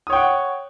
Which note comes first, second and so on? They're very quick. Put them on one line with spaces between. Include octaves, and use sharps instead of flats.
D#6 C#5 G5 F#5